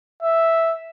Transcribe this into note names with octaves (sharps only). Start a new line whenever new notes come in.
E5